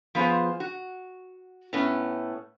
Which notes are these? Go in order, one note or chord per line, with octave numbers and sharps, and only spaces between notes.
F3 B3 F4 G#4 C5
F#4
A2 A3 B3 C#4